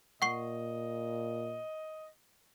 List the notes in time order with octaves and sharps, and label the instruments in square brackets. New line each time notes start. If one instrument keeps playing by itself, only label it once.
[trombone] A#2 [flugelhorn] D#5 [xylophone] F#5 C#6 C7